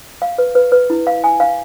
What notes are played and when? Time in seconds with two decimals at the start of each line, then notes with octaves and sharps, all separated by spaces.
0.22 F5
0.38 B4
0.55 B4
0.72 B4
0.90 E4
1.07 F5
1.24 G#5
1.40 F5